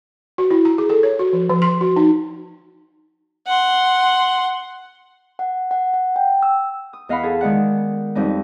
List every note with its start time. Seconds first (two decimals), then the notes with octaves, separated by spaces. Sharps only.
0.38 F#4
0.51 E4
0.65 A#5
0.78 G#4
0.90 A4
1.03 C#5
1.19 F#4
1.33 F3
1.49 F3
1.62 C6
1.81 F#4
1.96 D#4
3.47 F#5 C6
5.39 F#5
5.71 F#5
5.94 F#5
6.16 G5
6.43 E6
6.93 D#6
7.09 E2 D#5 F5 F#5 B5
7.23 G#4 A4
7.41 D#3 G#3 D5 F#5
8.15 F2 G3 D#4